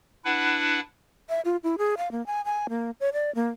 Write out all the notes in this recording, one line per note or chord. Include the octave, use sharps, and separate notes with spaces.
D4 E4 B4 F#5
E5
F4
E4
G#4
F5
A#3
G#5
G#5
A#3
C#5
D5
A#3